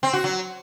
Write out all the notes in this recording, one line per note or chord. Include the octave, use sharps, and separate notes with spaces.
C4
F#4
F#3